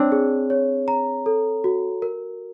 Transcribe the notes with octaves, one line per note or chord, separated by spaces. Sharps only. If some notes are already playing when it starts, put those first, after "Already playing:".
Already playing: C4 D4 C#5
G#4
C#5
A#5
A4
F#4
A#4